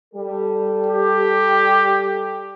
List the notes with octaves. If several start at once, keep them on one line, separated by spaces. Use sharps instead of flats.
G3 A4
G4